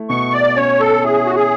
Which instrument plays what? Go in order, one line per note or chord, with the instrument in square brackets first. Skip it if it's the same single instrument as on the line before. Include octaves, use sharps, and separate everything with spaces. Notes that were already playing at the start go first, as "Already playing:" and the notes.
Already playing: [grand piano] A3 E4
[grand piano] B2 [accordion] C#6
[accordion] D5
[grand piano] C#4 [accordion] C#5
[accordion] A4
[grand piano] E4 [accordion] G#4
[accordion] F#4
G#4